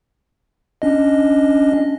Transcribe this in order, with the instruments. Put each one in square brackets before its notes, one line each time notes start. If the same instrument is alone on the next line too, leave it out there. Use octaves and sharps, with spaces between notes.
[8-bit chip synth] C#4 D4 D#5